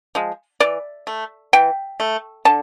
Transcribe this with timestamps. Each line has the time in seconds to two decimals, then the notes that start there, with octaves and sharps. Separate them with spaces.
0.15 F3 G#3
0.60 E3 D5
1.07 A3
1.53 E3 G5
2.00 A3
2.45 D3 A5